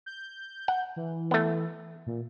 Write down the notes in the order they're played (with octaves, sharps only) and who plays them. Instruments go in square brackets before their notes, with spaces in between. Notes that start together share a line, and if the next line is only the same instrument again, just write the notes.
[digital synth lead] G6
[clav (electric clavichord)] F#5
[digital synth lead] E3
[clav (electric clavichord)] A3 B3
[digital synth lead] A#2